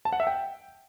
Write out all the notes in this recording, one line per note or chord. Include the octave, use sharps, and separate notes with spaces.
A5
F#5
E5
G5